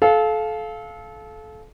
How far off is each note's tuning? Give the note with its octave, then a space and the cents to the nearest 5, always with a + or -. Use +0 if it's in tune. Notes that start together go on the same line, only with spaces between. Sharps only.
A4 -30 F5 +0